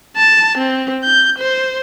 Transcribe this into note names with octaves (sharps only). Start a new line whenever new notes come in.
A5
C4
G6
C5